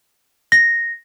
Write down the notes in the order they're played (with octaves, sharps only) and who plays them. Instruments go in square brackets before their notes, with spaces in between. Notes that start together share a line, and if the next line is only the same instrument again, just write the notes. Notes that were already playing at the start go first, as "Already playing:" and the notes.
[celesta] A#6